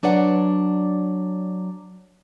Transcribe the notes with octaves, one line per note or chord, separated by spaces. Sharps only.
F#3 D4 B4 D5 F#5